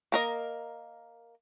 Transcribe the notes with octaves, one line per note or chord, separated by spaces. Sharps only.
A#3 A#4 D#5